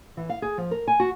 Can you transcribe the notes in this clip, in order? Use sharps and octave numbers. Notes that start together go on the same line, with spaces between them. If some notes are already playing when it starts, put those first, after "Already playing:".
E3
F5
G#4
F3
A#4
G#5
F#4